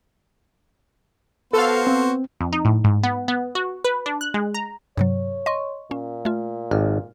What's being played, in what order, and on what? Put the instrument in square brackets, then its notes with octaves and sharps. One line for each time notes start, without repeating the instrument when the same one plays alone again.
[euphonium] B3 [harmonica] F#4 C5 [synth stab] A4 F5
[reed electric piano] C4
[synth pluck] F2
D#4
A2
G#2
B3
B3
F#4
B4
D4
F#6
G#3
A#5
[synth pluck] G2 C3 F#3 [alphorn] C#5
[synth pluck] D#5 C6 C#6
[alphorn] A#2 [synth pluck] C#4
[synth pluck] A3 F4
[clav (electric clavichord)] G#1 [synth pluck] F6